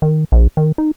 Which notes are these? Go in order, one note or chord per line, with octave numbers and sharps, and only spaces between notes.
D#3
A#1
D#3
D#4